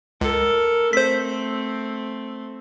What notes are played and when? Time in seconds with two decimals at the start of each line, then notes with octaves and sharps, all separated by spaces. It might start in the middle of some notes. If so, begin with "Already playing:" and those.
0.21 C#2 A4 A#4
0.93 A3 C4 C5 B6